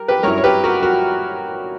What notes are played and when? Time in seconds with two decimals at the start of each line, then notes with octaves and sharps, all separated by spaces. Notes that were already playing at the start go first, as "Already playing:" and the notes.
Already playing: G3 A#4
0.08 G4 B4
0.23 G2 F#3 C#4 E4 A#4 C#5
0.38 C#5
0.44 G4 B4
0.64 F#4 A#4
0.83 F#4 A#4